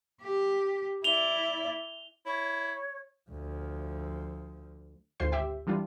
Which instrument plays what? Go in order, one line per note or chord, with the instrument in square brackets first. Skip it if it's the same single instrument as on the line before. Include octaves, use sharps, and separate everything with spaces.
[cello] G4
[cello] E4 D5 [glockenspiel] F7 G7
[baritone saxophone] E4 [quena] C#5
[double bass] D2 F3
[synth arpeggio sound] G#1 D2 F4 C5 C6 C7
G4 E5 G5
E3 G3 D4 F4